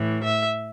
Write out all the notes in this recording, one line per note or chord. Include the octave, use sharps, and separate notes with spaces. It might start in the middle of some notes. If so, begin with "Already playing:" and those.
Already playing: A2 E3
E5